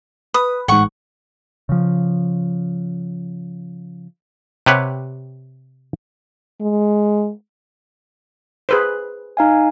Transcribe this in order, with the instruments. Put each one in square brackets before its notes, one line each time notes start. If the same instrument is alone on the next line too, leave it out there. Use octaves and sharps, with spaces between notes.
[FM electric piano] B4 [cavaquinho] D#6
[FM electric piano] A1 G#2 [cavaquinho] F#5 C#6
[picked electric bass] C#3 F3
[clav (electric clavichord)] C3 G4 B4 C#5 F#5
[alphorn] G#3
[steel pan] G#4 B4 C5
[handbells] D#4 F5 G#5